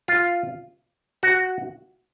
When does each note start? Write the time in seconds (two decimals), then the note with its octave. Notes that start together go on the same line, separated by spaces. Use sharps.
0.08 F4
1.23 F#4